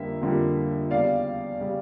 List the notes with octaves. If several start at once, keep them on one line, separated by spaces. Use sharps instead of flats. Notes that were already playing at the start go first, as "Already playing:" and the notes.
Already playing: F2 D3 G3 A#3 E5
F2 D3 G3 A#3
E2 C#3 G3 D5 F5
C#3 G3